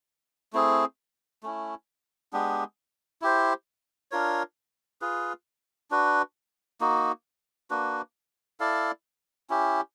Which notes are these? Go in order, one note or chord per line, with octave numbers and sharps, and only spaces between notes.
A3 C4 E4 G#4
A3 C#4 E4
G#3 B3 D4 G4
E4 G4 C5
D4 F4 A#4 C#5
F4 G#4 B4
D4 F#4 B4
A#3 D#4 F#4
A#3 D4 F#4 B4
E4 A4 D5 F5
C#4 E4 G4